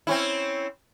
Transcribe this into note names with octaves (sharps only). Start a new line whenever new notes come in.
C4 C#4 E4